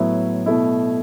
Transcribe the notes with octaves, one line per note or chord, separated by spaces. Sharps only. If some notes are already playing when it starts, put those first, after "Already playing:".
Already playing: A2 F#3 B3 E4
B2 A3 E4